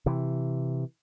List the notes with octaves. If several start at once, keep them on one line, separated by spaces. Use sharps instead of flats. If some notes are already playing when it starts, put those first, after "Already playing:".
C3 E3